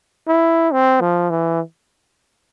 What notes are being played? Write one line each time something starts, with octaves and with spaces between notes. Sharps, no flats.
E4
C4
F3
E3